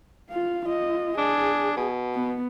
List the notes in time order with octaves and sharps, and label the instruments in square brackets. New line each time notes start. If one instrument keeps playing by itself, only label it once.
[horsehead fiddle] F4 F5
F4 D#5
[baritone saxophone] D4 [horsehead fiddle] G#4
[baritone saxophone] B2
[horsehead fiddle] B3